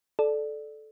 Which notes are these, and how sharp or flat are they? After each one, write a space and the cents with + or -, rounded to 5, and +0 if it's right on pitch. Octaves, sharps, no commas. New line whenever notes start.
A4 -15 D5 +10